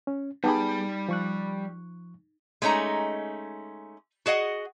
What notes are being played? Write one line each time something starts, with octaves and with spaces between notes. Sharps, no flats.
C#4
G3 B3 D#4 G4 G#4 B5
F3 C#6 F#6
G#3 A3 C#4 D#4 A#5
F#4 G#4 D#5 F#5